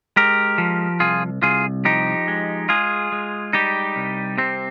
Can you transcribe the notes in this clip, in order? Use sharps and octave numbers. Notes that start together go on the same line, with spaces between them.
G#3 G4 A#4
F3
C2 F4 G#4
C2 F4 G#4
F3 D#4 G4
G#3
G#3 F4 G#4
G#3
G3 D#4 G4
C2
C3 C4